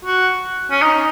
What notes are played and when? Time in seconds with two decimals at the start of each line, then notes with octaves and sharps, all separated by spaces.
0.05 F#4
0.71 C#4
0.82 D#4